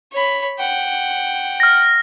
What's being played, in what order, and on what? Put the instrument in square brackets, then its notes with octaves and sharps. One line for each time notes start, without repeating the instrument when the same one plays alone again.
[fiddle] C#5 B5
F#5 G5
[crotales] F6 A#6